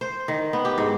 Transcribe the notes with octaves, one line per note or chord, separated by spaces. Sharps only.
C5
D#3
B3
G4
G#2